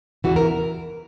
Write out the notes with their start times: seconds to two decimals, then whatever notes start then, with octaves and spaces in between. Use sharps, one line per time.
0.24 E2 C#3 E3 F#4
0.36 A#4